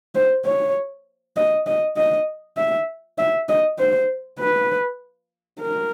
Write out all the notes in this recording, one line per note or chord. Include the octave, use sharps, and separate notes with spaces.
C5
C#5
D#5
D#5
D#5
E5
E5
D#5
C5
B4
A#4